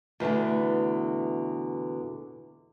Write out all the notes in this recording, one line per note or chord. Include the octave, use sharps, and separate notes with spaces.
E2 B2 D3 A3